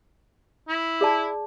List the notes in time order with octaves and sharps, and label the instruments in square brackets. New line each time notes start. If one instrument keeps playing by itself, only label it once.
[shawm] E4
[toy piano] G#4 D5 A5